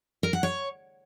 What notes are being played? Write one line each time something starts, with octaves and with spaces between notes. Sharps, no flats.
A#4
F#5
C#5